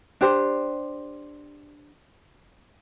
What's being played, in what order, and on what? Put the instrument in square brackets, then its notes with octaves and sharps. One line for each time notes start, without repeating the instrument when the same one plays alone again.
[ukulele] D4 G4 C5